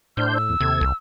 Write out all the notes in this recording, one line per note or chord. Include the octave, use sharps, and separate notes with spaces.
A2 D4 C5 F6 G6
E6
E2
D#2 C3 A4 G#6
C2